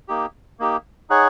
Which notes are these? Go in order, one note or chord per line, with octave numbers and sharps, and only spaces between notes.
A#3 D#4 G4
A#3 D#4 G4
D#4 G#4 C#5 F#5